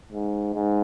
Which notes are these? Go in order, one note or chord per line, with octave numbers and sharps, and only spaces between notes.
G#2
G#2